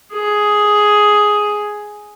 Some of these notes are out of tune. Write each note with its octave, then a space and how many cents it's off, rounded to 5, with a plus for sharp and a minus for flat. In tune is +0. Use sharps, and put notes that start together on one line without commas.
G#4 +5